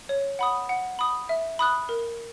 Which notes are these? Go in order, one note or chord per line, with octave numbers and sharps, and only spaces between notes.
C#5
F#5 B5 D#6
F#5
B5 D#6
E5
B5 D#6 F#6
A#4